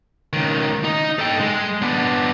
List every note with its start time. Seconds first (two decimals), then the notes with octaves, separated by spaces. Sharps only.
0.33 C#2 D#3
0.84 D#4
1.19 A4 G5
1.41 G#3
1.82 B3 D4